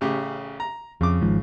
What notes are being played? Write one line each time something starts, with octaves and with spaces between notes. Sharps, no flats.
A1 C#3 G4
A#5
F2 C#3 D6
G#1 G#2 F3